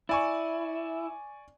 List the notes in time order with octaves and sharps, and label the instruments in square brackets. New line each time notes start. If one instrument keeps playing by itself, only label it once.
[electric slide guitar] E4 [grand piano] D5 G#5 C#6